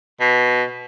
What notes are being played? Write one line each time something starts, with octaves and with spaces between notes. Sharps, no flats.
B2